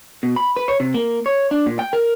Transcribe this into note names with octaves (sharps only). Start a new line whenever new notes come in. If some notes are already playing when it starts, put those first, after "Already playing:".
B2
B5
B4
C#5
C3
A#3
C#5
D4
A#2
G5
A#4